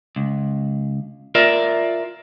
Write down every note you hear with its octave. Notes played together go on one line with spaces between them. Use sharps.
C#2
F4 A#4 D5 E5